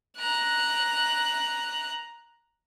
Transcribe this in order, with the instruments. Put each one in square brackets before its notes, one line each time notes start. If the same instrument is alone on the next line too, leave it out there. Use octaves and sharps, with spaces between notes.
[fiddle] A#5 F#6